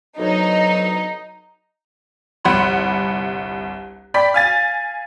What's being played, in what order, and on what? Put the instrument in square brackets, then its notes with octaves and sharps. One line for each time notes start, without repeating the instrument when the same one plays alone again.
[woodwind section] D2 B2 F#3 [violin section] D#4
[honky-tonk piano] G1 C2 F#5 B5 C6
D5 G5 B5 B6
F5 G#5 A6